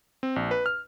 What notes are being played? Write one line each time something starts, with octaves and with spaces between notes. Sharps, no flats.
C4
A#1
B4
F6